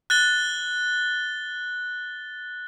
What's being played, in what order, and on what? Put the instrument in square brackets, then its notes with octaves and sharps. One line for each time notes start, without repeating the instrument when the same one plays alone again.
[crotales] F#6 A6 G7